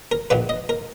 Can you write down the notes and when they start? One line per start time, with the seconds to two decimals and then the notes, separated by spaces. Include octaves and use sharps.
0.12 A#4
0.30 A#1 A#2 A#3 B4
0.49 D#5
0.69 A#4